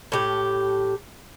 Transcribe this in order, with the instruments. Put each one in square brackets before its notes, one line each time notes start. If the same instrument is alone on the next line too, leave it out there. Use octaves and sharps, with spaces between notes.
[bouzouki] A2 G4